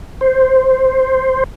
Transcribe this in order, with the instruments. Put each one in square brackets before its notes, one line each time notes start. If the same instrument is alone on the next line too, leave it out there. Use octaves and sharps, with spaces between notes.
[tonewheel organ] C5